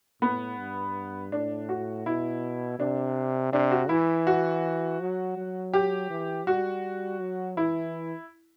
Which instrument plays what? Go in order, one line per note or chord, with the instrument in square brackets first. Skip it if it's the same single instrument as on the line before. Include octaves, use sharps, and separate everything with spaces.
[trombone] A2 [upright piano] B3
[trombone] G2
[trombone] A2 [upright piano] D4
[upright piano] F#4
[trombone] B2 [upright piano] E4
[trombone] C3 [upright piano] D4
[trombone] C3 [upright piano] D4
[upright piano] F#4
[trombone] E3 [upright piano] E4
[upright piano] F#4
[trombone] F#3
F#3
[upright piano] G4
[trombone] E3
[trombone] G3 [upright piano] F#4
[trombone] F#3
[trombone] E3 [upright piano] E4